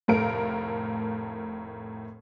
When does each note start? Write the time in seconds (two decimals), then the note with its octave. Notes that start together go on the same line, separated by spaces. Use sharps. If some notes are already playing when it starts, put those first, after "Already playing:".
0.08 F1 A2 A3 A#4 F5 D7